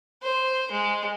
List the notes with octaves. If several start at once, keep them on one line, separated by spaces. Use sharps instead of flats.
C5
G#3